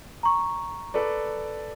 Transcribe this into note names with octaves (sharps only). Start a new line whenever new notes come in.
A#5 C#6
A4 B4 D5